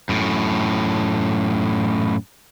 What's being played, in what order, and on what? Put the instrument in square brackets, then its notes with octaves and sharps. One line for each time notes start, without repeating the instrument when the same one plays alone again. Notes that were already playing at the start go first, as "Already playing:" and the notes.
[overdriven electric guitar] F#2 A2